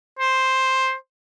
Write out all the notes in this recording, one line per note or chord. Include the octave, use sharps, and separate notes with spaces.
C5